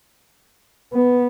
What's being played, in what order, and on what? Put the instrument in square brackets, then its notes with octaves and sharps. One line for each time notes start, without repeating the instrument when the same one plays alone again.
[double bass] B3